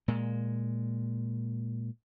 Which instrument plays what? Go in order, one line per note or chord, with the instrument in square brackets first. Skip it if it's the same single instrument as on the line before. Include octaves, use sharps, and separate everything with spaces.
[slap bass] A#2 G#3